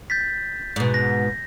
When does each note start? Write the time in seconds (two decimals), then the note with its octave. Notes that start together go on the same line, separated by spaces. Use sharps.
0.10 G6 A6 B6
0.76 G#2 B2
0.94 A#6